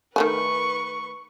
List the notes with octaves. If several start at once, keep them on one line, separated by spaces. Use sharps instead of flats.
D#3 A3 B4 G#5 C#6